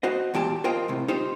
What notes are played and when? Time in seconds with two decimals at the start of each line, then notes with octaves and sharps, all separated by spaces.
0.03 F#4 C5 D#5
0.34 E2 A#2 G4 A5
0.64 F4 A#4 C5 D#5 G5
0.88 A2 C3
1.08 D#4 F4 G4 C5